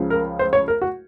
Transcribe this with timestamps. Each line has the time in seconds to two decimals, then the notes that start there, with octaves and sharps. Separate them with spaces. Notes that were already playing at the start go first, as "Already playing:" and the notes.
Already playing: C#2 C#3 F3
0.10 A#4
0.39 C5
0.53 C#5
0.68 A#4
0.82 F#4